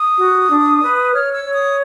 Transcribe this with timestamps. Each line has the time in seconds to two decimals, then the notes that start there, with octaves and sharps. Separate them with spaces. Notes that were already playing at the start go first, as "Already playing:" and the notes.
Already playing: D#6
0.18 F#4
0.50 D4
0.81 B4
1.12 C#5 F6
1.33 E6
1.44 C#5
1.54 D#6